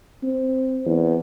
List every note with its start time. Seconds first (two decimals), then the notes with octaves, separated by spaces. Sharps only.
0.23 C4
0.85 E2